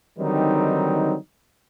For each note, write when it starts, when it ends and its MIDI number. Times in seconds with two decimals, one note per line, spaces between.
0.19 1.16 50
0.19 1.16 51
0.19 1.16 54
0.19 1.16 55
0.19 1.16 60
0.19 1.16 63